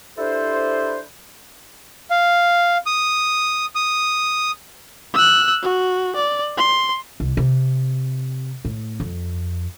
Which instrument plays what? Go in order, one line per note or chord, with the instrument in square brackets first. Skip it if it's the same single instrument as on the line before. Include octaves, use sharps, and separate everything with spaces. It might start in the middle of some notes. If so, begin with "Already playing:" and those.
[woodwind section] D4 E4 G4 A4 B4 C5
[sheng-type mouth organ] F5
D#6
D#6
[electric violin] E6 F#6
F#4
D5
C6
[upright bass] C2
C3
A2
F2